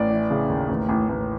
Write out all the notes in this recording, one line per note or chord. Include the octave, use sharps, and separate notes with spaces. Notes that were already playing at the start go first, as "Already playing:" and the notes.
Already playing: A1 D5
E3
C#3
D#2
A1
A1
A1